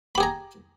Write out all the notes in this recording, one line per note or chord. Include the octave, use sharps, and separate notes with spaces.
G4 G#4 A#5 B5